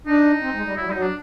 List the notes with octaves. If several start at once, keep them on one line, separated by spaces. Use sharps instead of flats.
D4 D#4
C4
G#3
G3
F#3 E4
G3
F#3 D#4
D4